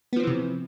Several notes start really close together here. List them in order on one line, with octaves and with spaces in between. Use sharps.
B3 F3 C4 E3 C3